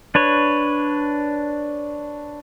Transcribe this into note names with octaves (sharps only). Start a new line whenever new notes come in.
D4 B4 C#5